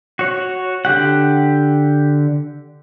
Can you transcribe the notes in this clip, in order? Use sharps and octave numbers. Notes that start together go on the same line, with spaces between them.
F#4 C#5
D3 G4 F#5